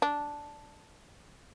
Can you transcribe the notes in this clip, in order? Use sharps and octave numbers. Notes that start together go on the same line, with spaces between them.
D4